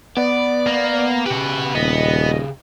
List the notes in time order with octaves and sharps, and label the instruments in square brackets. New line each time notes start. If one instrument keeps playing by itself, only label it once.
[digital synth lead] B3 [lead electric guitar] D5
[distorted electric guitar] A#3
[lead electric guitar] C#3 G4 [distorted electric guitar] F#4 B4
[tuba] D#1 [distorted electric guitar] B3 [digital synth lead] D#5